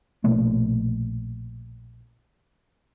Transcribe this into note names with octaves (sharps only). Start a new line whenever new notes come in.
A#1 B2 A3 A#3